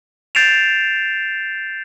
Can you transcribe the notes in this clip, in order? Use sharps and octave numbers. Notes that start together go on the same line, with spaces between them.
G6 A6 C7 D7 E7 F7